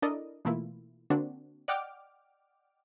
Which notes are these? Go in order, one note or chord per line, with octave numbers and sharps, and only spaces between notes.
D4 E4 A4 A#4 D5 D#5
B2 E3 A3 A#3 E4 F4
D3 A#3 C4 D4 F#4
D5 D#5 F#5 G5 D6 F6